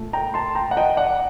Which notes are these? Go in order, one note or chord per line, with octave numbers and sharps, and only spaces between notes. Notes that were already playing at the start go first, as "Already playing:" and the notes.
Already playing: A#2 A3
G5 A#5
A5 C6
G5 A#5
F#5
D#5 G5
D5 F#5